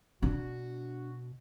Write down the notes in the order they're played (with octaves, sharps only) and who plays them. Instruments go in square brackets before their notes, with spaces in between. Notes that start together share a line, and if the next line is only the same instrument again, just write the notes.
[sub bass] B2 [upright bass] D4 [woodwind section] F#4